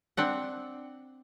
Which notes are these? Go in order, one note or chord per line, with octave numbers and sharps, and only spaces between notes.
C4 D4 F#5